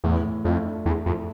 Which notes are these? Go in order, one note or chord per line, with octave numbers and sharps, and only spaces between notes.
E2 A2
A2
F2 A3
D4
E2 D4
F2 A2